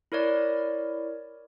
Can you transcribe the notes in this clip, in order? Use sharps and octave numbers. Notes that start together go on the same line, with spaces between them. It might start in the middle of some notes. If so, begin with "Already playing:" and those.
E4 A#4 C#5 D5